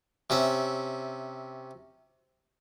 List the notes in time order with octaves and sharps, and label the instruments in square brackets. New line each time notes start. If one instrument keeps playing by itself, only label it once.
[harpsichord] C3 C#4 E5